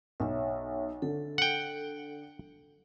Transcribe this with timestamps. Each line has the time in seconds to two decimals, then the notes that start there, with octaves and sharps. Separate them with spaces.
0.20 B1 C#5 E5
1.02 D3 A4
1.38 F#5 G5